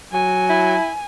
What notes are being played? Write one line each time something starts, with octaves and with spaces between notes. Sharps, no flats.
F#3 G#5
E4